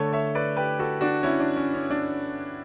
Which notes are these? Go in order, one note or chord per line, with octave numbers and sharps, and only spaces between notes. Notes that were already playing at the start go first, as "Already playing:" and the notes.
Already playing: D3 A3 A4 C#5
C#5 E5
B4 D5
G4 B4
F#4 A4
D4 F#4
C#4 E4
D4
C#4
C#4
D4